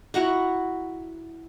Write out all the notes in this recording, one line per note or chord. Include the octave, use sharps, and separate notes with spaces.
E4 F#4 F#5 A#5